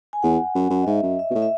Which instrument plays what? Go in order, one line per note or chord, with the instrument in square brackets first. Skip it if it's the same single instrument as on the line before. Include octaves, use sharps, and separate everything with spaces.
[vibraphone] G#5
[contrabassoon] E2 [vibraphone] F#5
[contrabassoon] F#2
F#2
[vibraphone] D#5
[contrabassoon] G#2 [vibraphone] E5
[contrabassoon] F#2
[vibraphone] E5
[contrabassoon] B2
A2
[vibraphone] E5